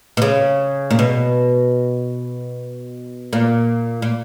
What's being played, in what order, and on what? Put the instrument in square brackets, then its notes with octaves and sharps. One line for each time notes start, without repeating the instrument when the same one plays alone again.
[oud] B2
C#3
A#2
B2
A#2
A#2